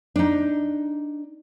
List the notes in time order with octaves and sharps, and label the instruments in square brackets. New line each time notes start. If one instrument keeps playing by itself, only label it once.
[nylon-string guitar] D4 D#4